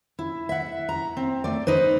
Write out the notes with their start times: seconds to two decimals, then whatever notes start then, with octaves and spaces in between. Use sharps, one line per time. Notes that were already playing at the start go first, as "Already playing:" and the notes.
0.19 E4
0.49 E5 F#5
0.89 A#5
1.17 C4
1.44 A3 D5
1.67 D#4 B4 C5